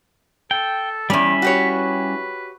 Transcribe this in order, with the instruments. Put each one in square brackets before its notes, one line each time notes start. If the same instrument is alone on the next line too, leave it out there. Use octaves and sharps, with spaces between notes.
[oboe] A4 [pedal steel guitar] G5
[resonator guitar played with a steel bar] E2 D5 [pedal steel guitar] G3 C#4 E4 [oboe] B5
[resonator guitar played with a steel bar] F#4 G4 C#5
[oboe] B4